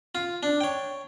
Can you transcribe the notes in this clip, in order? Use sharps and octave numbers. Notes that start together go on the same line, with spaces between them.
F4
D4
C#5 G5